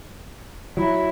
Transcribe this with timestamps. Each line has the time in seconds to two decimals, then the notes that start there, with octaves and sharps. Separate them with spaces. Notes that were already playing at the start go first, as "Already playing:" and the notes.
0.77 F#3 E4